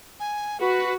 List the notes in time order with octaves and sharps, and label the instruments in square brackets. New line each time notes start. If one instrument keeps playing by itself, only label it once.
[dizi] G#5
[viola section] F#4 [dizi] B4